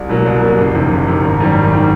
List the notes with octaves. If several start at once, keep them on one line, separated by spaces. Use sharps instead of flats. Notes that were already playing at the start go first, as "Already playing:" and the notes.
Already playing: C2
B2 F#3 A#3
C2
B2 F#3 A#3
F#1
F2 C3 D#3
F#1
F2 C3 D#3
G#1
F#2 D#3 G3
G#1
D#3 G3